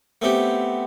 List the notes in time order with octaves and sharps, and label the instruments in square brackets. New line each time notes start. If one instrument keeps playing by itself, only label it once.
[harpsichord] A3 B3 C4 G4